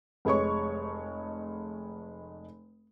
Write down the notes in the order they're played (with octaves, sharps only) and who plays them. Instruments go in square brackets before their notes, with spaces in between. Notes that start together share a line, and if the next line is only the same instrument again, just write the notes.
[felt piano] F1 G#3 C#5 C#6